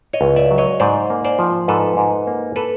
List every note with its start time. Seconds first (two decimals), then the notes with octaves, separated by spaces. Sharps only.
0.13 C#5 D#5
0.21 C#2
0.36 D5 E5
0.51 F#3
0.58 C#5 D#5
0.80 G#2 C5 D5
1.10 A#3
1.25 C5 D5
1.39 F3
1.68 G#2 A4 B4
1.97 G#2
2.27 A#3
2.56 A4 B4